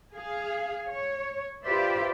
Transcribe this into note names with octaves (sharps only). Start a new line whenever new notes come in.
G#4 F5
C#5
F4 G4 B4 C5 D5 E5